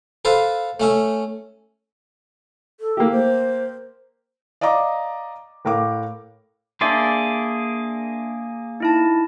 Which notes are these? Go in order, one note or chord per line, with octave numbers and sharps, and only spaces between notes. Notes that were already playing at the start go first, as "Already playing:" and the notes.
A4 B4 C5 F5
A3 C#4 E5
A4
A#3 G4
C5
D5 D#5 F5 A#5 D6
A2 A#4 F5 D6
A#3 D4 G#4 D5 E5 C6
D#4 E4 A5